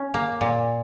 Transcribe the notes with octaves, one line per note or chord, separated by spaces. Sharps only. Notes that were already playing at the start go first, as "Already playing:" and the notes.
Already playing: C#4
A#3
A#2